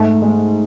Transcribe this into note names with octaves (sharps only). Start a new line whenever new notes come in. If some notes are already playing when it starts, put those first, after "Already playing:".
Already playing: G#2 A3
G#3